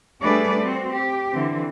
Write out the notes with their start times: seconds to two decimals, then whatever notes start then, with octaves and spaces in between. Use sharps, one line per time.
0.22 G3 A3 D4 G#4 B4 D5
0.62 C4 F#4
0.91 G4
1.31 D3 E3 C4